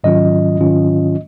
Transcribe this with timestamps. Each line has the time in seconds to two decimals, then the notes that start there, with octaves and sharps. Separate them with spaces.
0.04 G#2 D#3 F#3 C#4 F4 D#5
0.59 G#2 D#3 F#3 C#4 F4